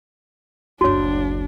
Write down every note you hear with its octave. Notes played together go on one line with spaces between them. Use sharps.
F#1 D2 D4 F#4 C#5